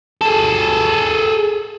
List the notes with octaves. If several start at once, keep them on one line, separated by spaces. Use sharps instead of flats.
G#4 A4